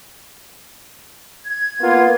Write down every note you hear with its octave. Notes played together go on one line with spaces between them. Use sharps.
G#6
A#3 B3 F4